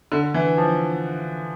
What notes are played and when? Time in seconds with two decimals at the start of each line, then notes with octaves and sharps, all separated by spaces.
0.12 D3
0.34 E3
0.57 F3